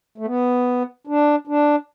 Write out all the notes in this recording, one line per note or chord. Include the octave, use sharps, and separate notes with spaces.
A3
B3
D4
D4